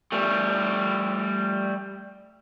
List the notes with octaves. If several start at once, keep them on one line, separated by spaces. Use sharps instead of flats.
G3 A3